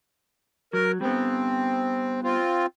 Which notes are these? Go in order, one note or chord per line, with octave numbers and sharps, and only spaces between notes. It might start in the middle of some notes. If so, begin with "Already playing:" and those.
F#3 A#4
G3 B3 C4
C4 F4